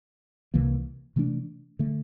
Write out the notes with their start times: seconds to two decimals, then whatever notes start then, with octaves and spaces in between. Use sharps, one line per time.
0.54 C2 C3 E3 A#3
1.16 C3 E3 A3 D4
1.79 D3 A3